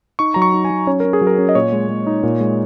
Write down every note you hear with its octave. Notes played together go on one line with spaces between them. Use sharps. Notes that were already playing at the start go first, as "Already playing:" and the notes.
D#4 C#6
F#3 A#5
C#6
D#4
G#5
F#3
C#4 C#5
C#4 A#4
G#4
F#3
A#4
C#4
D#5
A#2 C#5
G#3
G#3
D#4
A#2
G#3